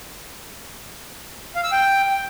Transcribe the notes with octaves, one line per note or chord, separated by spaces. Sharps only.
F5
E6
G5